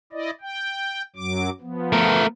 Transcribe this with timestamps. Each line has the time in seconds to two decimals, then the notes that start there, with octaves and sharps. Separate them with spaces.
0.13 E4 D5 D#5
0.41 G5
1.16 F#2 F#3 D6
1.61 F3 B3
1.92 A3 A#4